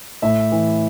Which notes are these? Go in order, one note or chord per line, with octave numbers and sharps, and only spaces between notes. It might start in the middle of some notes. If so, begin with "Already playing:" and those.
A2 E5
E3